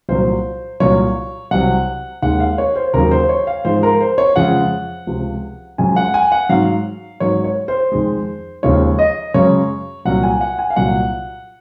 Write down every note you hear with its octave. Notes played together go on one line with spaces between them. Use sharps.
C2 A#2 F#3 C5
C2 A#2 F#3 C#5
C2 C3 F#3 F#5
D#2 D#3 G#3 F#5
F5
C#5
C5
D#2 C#3 F#3 A#4
C5
C#5
F5
G#2 F3 G#3 C5
A#4
C5
C#5
F2 C#3 F3 G#3 F#5
C#2 C3 F3
F#2 F3 G#3 G#5
F#5
G#5
F#5
G#2 F#3 F5
G#2 F#3 C#5
C#5
C5
F2 D#3 G#3
D#2 C#3 F3 G#3 C#5
D#5
F#2 C#3 G#3 C#5
C2 A#2 F#3 F#5
G#5
F#5
G#5
F5
C2 A#2 F#3 F#5